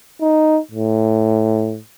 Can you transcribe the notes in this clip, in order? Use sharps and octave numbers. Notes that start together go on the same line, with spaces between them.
D#4
A2